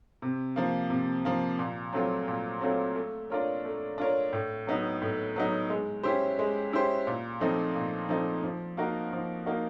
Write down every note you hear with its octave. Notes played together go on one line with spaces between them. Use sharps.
C3
F3 A#3
C3
F3 A#3
A#2
F#3 A3 C4 F4
A#2
F#3 A3 C4 F4
A3
D4 F4 A#4 C#5
A3
D4 F4 A#4 C#5
A2
F#3 B3 D#4
A2
F#3 B3 D#4
G#3
C#4 E4 G4 C5
G#3
C#4 E4 G4 C5
A#2
F3 A3 C4 D#4
A#2
F3 A3 C4 D#4
F3
A#3 D#4 F#4 A#4
F3
A#3 D#4 F#4 A#4